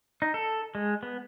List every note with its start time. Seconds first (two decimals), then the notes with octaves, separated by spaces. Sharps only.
0.22 D#4
0.34 A4
0.75 G#3
1.03 B3